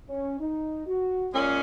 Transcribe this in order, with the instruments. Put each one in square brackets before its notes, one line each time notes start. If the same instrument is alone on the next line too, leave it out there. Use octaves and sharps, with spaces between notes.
[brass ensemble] C#4
D#4
F#4
[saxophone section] A#2 G#3 C#4